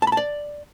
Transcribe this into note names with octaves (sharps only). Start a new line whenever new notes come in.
A5
B5
A5
D5